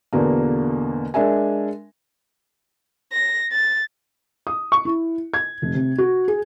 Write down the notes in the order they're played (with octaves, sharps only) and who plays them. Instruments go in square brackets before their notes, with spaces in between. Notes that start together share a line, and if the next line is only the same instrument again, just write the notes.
[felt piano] E2 B2 D3 A#3
G#3 D4 A#4 E5 G#5
[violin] A#6
A6
[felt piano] D#6
C#6
E4
G#6
F1
C3
F#4
G#4